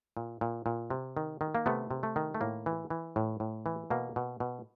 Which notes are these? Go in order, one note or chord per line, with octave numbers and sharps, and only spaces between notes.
A#2
A#2
A#2
C3
D#3
D#3
A#3
C3 A3 B3
C3
A3
D#3
A3
A2 A#3
E3
E3
A2
A2
E3
B2 A#3
B2
B2